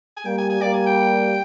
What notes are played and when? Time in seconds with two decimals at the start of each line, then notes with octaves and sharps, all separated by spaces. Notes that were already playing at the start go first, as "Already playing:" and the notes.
0.17 G#5
0.25 G3 A#3 G5
0.38 G#5
0.50 G#5
0.61 G3 A#3 D5
0.74 G#5
0.86 G5